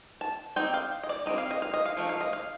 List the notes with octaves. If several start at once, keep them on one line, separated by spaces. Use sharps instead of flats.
A5
G3 C4 D#4 G5
F5
D#5
D5
G3 C4 D#4 D#5
F5
D#5
F5
D#5
F5
F3 A3 D#4
F5
D#5
F5